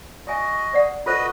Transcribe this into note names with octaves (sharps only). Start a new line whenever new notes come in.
F#4 D#5 E5 G#5
C5 D5 F#5
F4 F#4 A4 B4 C5 D#5